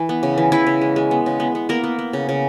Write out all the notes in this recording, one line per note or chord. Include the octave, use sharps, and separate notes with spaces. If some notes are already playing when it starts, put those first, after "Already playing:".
Already playing: E3
B3
C#3
E3
C#3 E3 E4
C#3
G#3
G#3
B3
C#3
B3
B3
A#3 B3 A#4
B3
B3
C#3
C#3